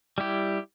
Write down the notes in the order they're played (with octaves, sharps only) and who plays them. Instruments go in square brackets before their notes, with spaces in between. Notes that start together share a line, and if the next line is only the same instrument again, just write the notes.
[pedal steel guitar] G3 E4 G4